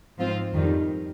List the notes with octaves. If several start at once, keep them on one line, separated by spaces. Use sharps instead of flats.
G#2 F3 C4 F4 C5
F2 D#3 G3